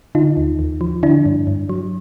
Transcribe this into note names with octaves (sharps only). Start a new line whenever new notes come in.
D3 D#4 F4
D#2
D#2
F3
D3 D4 E4
G2
G2
F#3